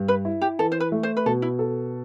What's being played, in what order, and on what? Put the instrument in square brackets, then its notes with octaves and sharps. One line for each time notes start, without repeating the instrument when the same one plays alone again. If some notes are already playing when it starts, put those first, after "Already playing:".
Already playing: [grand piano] G2
[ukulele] B4
[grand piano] E4
[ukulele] G4
[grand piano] E3 [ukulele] A4
[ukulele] C5
B4
[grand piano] A3
[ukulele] C5
B4
[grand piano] B2 [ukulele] A4
[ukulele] E4
[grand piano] A4